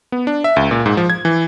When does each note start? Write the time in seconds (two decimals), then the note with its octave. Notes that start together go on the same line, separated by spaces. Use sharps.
0.12 B3
0.27 D4
0.44 E5
0.56 C#2
0.71 A#2
0.86 G#2
0.97 F3
1.10 G#6
1.25 E3